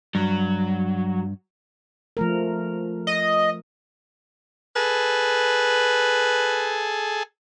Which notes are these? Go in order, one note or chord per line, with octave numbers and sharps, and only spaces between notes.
G2 F#3
F3 A3 A#4
D#5
G#4 A4 B4